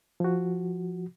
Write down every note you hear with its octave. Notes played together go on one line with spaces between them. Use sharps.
F3 F#4